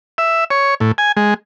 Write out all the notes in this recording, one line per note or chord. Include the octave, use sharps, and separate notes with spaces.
E5
C#5
A2
G#5
G#3